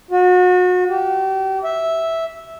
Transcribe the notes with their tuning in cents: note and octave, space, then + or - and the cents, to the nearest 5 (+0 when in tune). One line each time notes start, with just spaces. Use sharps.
F#4 -35
G4 -35
E5 -5